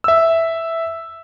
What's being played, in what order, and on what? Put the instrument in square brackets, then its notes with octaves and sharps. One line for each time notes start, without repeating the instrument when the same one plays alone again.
[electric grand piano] E5 E6